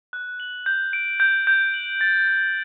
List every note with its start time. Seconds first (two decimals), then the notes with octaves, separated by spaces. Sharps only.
0.13 F#6
0.40 F#7
0.66 G6
0.93 D7
1.20 G6
1.47 G6
1.74 F#7
2.01 A6
2.28 A6